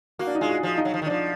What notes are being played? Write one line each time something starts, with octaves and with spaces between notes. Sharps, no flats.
A#3 F#4
D4
D#4
G#3 F4
F#4
F3
D#4
F#3
F3
D#3
F3 D4